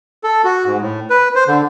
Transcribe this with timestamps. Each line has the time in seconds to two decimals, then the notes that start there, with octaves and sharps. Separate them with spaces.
0.24 A4
0.44 F#4
0.66 G#2
0.81 A2
1.10 B4
1.35 C5
1.47 D3